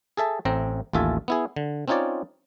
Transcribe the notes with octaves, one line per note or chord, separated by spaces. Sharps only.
G#4 A4 E5 A5
A1 A2 C4 A#5
A1 D#2 F4 A4 E5 G#5
B3 E4 G#4
D3
C4 C#4 D#4 F4 C#5 D5